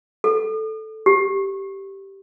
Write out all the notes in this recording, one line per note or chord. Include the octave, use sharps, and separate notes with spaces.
A4
G4